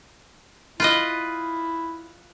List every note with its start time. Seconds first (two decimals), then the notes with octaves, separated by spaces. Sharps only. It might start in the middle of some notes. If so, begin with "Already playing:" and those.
0.80 E4 F4 B4 D#5